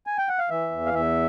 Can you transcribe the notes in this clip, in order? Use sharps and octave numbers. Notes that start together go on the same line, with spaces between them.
G#5
G5
F#5
F5
E3 E5
E2
F5
E2 E5